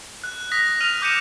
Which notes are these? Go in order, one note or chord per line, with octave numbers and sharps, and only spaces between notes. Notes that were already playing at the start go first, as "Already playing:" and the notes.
F#6
D#6 A#6 B6
F6 D#7 F7
D6 G6 A#6 C#7 D#7 E7